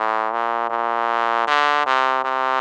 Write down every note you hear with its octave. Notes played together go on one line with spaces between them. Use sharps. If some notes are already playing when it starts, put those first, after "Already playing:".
Already playing: A2
A#2
A#2
D3
C3
C3